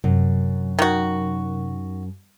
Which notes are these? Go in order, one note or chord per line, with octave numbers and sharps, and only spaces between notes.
F#2 C3 F#3
D#3 F#4